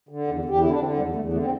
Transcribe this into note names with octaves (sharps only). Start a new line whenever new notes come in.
D3
E2
E2 G4
D3 E4
D4
D3 C4
E2 G3
E2 A3
D3 A3
C4